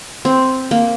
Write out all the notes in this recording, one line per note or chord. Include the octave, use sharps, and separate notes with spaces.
C4
A#3